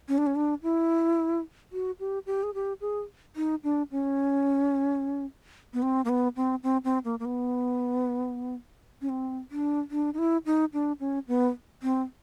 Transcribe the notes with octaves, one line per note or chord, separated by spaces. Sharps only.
C#4
D4
C#4
D4
E4
F#4
G4
G4
G#4
G4
G#4
D#4
D4
C#4
B3
C4
A#3
B3
C4
C4
C4
A#3
A#3
B3
C#4
C4
D4
D4
D#4
E4
D#4
D4
C#4
B3
C4